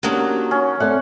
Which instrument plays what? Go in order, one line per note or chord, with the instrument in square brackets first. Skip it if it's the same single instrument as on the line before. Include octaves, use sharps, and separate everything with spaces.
[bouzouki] D#3 F#3 [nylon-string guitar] A#3 D4 C5 [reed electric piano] C#4 G4
[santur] C#4
[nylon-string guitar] A3 A4 C5 [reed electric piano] C4 D5 E5 [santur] F#5